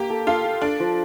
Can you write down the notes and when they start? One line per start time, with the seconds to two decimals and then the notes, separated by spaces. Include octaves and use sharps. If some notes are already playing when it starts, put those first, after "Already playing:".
Already playing: A#3 G4
0.10 A4
0.27 F4 A4
0.45 A4
0.62 D4 A4
0.80 F3